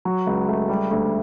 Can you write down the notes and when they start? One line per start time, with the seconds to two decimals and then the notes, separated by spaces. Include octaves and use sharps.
0.05 F#3
0.27 C#2
0.48 A3
0.69 G3
0.91 D2